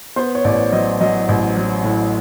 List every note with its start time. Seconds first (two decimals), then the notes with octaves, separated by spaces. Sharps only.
0.16 B3 C5
0.35 C#5
0.44 A1 D5
0.72 F#3 D#5
1.00 F#3 D#5
1.29 A1
1.56 F#3
1.84 A2